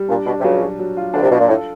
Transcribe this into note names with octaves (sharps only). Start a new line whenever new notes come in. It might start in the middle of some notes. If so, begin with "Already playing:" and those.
Already playing: G3
A#2 D4
B2 D4
C3
C#2 C#3 F#3
F#3
F#3
F4
D2 D3 D4
C2 C3
B2 F4
A#2
A2 A4